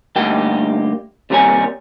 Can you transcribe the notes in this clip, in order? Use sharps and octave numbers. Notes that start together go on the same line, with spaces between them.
D2 G2 A#3 D#4 G4 G5
D#2 C3 G3 A#4 C#5 G#5